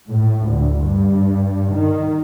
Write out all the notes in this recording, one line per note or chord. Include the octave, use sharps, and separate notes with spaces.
A2
D2
G2
D#3